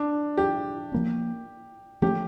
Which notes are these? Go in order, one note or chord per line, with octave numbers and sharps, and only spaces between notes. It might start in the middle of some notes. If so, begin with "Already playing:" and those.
Already playing: D4
G4
F3 A#3 C#4
F3 A3 C#4 G4